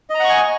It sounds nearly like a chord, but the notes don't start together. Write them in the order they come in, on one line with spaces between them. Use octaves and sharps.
D#5 A#5 F#5 C#6 G#5